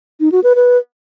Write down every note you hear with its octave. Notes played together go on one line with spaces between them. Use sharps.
D#4
F#4
B4
B4